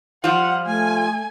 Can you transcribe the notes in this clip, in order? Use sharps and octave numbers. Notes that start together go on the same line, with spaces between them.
F3 G3 F4 F#5
A3 G#5